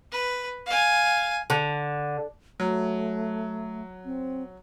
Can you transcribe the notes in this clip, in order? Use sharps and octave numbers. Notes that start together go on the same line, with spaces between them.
B4
F5 G#5
D3
F#3 A3
C4